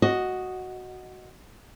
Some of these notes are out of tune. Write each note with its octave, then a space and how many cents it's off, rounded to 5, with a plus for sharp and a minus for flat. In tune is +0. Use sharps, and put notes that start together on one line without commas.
F#4 +0 D#5 +0